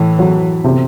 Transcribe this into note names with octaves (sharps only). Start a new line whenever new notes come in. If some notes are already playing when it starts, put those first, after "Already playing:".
Already playing: A2 E3
F#3
C3